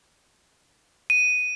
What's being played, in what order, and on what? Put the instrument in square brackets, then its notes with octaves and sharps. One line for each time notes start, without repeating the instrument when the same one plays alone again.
[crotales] D#7